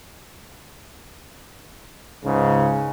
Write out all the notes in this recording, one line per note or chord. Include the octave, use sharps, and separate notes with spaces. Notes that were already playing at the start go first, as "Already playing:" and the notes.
C#2 G#2 C#3